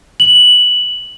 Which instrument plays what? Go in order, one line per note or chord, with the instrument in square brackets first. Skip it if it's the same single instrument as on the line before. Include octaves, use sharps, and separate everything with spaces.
[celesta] F#7